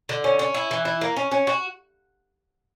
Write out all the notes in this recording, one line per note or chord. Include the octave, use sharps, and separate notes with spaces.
D3
C#4
C#4
E4
E3
E4
A#3
C#4
C#4
F#4